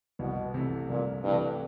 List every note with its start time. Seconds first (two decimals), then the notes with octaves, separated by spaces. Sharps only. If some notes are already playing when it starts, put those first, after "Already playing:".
0.19 C2 B2
0.54 C3 E3 A3
0.89 C2 A#2
1.24 G2 C3 E3 A3